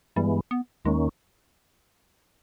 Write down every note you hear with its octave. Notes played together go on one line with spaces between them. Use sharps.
G2 E3 G3 G#3 B3
B3
D#2 D#3 G#3 A#3 C#4